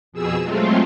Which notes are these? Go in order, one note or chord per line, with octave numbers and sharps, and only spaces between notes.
F2 B2 G#4 E6
F#3 G#3 A3 C4 F4